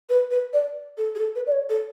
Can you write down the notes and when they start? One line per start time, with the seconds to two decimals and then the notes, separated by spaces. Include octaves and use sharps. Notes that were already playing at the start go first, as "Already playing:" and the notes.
0.09 B4
0.31 B4
0.53 D5
0.97 A4
1.15 G#4
1.19 A4
1.35 B4
1.47 D5
1.52 C#5
1.69 A4